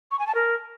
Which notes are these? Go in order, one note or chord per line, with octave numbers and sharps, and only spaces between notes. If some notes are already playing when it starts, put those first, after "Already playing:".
C#6
G#5
A5
A#4